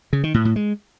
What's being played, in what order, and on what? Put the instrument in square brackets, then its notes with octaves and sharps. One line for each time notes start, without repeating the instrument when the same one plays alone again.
[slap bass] C#3
D#3
A2
A2
G#3